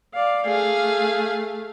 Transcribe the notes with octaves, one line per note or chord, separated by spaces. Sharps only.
D5 F5
A3 G#4 F5